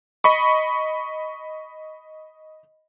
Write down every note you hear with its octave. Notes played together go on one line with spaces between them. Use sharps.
D#5 B5 C#6